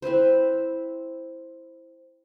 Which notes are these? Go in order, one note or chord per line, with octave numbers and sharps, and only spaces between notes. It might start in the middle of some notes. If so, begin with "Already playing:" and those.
C4 E4 B4 C5